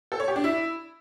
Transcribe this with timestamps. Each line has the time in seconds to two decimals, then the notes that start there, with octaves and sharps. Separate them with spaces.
0.12 A4
0.20 C#5
0.28 G4
0.36 D4
0.44 E4